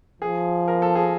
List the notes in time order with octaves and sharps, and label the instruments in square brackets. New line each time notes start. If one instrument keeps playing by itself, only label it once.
[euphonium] F3 [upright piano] G#4
[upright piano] A#4
A4
G#4